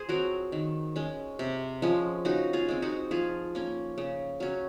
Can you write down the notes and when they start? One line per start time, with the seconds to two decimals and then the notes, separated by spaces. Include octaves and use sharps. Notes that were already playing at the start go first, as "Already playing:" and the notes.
Already playing: G#4 C5
0.09 F#3 C4 F#4 A#4
0.52 D#3
0.96 G#3 C#4
1.39 C3
1.82 F3 G#3 C#4
2.25 C#3 D#4 F#4
2.53 F4 G#4
2.68 G#3 C4
2.82 D#4 F#4
3.11 F3 F4 G#4
3.55 A#3 C#4
3.98 C#3
4.40 F#3 C#4